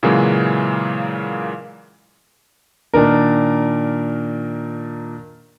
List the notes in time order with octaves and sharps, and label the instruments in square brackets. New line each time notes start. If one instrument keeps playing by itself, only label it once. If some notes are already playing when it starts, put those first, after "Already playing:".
[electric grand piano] A#2 C#3 E3 F#3 G#3 A#3
[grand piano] A#2 D#3 D4 A#4